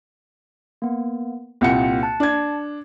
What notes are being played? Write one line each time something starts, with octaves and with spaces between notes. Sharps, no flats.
A#3 B3
C2 A#2 A#3 F#5 G5 C#7
A5 F#6
D4 G#6